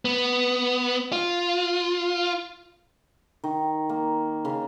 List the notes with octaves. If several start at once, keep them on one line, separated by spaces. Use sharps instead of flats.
B3
F4
D#3
A#3
C#3